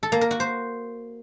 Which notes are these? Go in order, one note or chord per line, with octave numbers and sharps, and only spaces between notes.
A4
A#3
A#4
F#4
C5